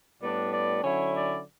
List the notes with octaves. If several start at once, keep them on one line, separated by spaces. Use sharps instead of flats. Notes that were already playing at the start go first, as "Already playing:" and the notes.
A2 G3 B3 D4 D5
D5
D3 F#3 C#4 E4 C#5
D5